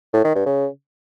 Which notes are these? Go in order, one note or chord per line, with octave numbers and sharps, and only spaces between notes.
A2
D#3
G2
C#3